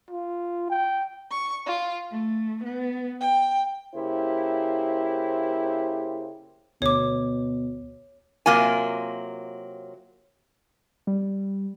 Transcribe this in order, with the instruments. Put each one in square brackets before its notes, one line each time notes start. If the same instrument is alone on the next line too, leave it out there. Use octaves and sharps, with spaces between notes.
[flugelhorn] F4
G5
[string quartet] C#6
F4
A3
B3
G5
[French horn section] C#3 A#3 E4 G4 C5
[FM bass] D2 [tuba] B2 [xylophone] C#5 D6
[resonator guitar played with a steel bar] C3 F#3 A#3 F4 G#5
[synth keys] G3